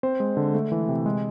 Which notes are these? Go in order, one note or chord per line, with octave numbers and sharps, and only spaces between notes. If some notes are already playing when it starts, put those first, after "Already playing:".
C4 C5
G#3
D3
A3
E3
C3
G#3